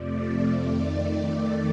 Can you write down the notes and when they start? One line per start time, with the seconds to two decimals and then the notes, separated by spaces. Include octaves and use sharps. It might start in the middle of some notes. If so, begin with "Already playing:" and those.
Already playing: F2 C3 F3 A3 D5
0.65 F2 D#3 A3 D5